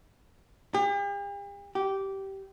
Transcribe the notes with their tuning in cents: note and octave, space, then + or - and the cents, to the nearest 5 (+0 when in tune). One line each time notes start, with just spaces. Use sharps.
G4 +45
G4 -15